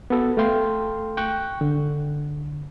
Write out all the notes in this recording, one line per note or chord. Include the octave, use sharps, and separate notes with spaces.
B3 F#4 A4
A3 A4 F5 G5 C6
G5 C#6 F#6
D3